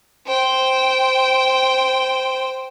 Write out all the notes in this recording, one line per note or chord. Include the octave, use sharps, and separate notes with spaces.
C5 G5